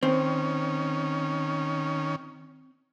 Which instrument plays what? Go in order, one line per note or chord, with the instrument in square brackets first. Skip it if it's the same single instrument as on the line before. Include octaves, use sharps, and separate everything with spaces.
[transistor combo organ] D#3 C#4 [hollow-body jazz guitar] C4